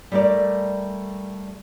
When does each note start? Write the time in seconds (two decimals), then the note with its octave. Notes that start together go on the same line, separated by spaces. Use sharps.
0.12 G3 A3 A4 A#4 D5